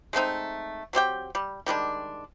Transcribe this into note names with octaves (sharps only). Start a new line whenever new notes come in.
G#3 A3 C4 D#4
F#3 C4 G4 G5
G3
D#3 G3 G#3 D4